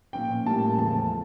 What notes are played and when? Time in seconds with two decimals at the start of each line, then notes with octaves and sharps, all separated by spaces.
0.13 A#2 F3 C#4 G5
0.46 A2 G3 A#3 C#4 A5
0.78 E2 C#3 F3 A3 C#4 A5